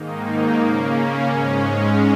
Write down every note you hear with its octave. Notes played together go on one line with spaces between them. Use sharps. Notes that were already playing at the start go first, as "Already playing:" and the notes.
Already playing: G#2 D#3 A#3 D#4
C#3 A#3 C#4
G#2 G#3 C#4